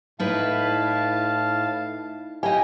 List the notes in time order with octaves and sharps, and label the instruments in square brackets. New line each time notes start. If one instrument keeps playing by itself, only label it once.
[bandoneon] A2 F5 A5 [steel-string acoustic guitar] D#4 E4 B4
[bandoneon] E4 G5 [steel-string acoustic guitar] G4 D#5 [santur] F5 G#5